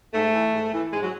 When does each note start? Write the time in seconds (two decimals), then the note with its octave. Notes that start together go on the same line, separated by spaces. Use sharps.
0.13 G#2 A3
0.34 E3
0.54 G#2
0.73 E3
0.92 G#2 G#3
1.02 F#3